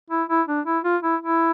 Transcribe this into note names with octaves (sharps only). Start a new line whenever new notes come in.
E4
E4
D4
E4
F4
E4
E4